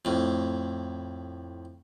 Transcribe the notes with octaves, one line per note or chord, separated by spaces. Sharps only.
F2 A2